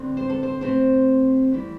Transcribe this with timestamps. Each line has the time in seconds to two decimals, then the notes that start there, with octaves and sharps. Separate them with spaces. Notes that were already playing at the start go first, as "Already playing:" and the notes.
Already playing: G2 D3 C4
0.17 C5
0.30 A4
0.43 C5
0.61 C3 A3 C4 C5
1.52 G2 E3 G3